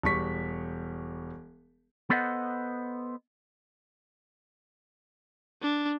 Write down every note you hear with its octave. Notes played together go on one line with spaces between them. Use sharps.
E1 G3 C#6 B6
B3 A4 B4 C5 D#5 F#5
D4